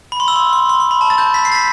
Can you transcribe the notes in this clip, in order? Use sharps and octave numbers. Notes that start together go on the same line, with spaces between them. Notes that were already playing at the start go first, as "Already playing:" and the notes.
B5
C6
E6
C6
C6
C6
C6
B5
A5
A6
G6
B6
C7
A6
B6